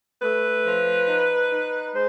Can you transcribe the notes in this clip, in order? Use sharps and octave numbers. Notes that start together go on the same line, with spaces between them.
A3 B4
F3
D#4
D#4
G#3 C5